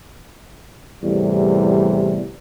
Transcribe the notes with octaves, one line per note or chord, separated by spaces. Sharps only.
E2 A2 C3 G3